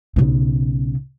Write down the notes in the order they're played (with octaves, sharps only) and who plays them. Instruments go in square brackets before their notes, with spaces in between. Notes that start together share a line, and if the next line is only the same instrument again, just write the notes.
[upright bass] B1 C#3